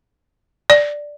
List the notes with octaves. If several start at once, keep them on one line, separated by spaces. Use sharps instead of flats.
D5